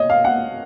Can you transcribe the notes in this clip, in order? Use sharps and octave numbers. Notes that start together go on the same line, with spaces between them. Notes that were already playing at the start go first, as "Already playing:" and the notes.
Already playing: C#5 D#5
F5
F#5